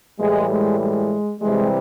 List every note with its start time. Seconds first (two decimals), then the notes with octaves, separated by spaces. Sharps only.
0.20 A2 E3 G3 G#3
0.50 G#3
0.80 G#3
1.40 C3 E3 G3 G#3